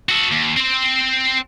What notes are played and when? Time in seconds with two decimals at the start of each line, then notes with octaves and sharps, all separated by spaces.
0.09 F#4 A4
0.31 D#2
0.56 C4 C5